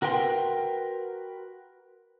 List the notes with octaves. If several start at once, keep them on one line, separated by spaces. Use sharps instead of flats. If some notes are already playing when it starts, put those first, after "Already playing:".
F#4 A#4 B4 G5 C6